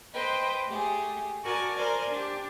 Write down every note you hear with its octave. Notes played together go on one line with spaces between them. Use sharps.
B4 C5 D#5 G5
A3 G4 G#4
F#4 A#4 D5 G#5 A5
A#4 C5 D5 G#5
D4 G4